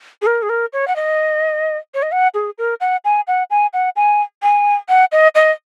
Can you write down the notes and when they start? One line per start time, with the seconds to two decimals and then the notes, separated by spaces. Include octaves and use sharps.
0.22 G#4
0.26 A#4
0.42 G#4
0.49 A#4
0.73 C#5
0.88 F#5
0.96 D#5
1.94 C#5
2.02 D#5
2.12 F#5
2.34 G#4
2.58 A#4
2.80 F#5
3.05 G#5
3.27 F#5
3.50 G#5
3.73 F#5
3.96 G#5
4.43 G#5
4.89 F#5
5.12 D#5
5.35 D#5